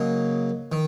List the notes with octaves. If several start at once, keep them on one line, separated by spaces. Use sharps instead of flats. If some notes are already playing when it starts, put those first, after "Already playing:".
Already playing: C#3 F#3 A#3 D#4
D#3